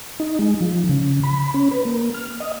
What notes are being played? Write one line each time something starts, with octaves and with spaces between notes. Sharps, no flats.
D#4
G#3
F3
C#3
B5
C#4
B4
A#3
F6
D#5